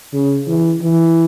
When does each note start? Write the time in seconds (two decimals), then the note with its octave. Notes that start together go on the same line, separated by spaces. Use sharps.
0.13 C#3
0.48 E3
0.82 E3